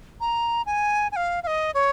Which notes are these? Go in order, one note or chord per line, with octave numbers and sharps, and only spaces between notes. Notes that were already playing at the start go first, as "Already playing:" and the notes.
A#5
G#5
G#5
F5
F5
D#5
C#5